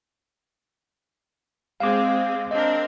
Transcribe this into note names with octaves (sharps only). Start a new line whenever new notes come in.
G#3 C4 F5 D6
C4 D4 A#4 D#5